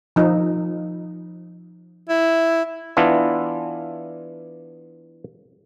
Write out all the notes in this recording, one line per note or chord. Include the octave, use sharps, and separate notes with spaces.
F3 D#4
E4
E3 B3 D4 E4 F4